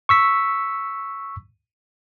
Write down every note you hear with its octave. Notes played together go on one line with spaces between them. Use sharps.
C#6 E6 B6